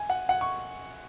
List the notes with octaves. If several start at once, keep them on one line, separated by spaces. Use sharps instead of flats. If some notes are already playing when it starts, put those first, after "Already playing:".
Already playing: G#5
F#5
F#5
C#6